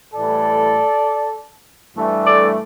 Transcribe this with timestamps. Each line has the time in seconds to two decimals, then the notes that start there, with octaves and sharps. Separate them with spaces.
0.14 A2 E3 G3 A4 D5
1.96 G2 E3 A3
2.26 A4 D5